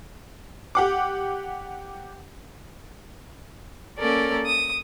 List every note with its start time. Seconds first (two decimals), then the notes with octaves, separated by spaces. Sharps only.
0.75 G4 F#5 D6
3.98 A#3 C#4 A4 A#4 D5
4.46 D#6